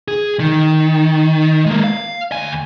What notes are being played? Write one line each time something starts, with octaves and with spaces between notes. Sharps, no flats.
G#4
D#3
G#3 A#3
F5
D2 G#5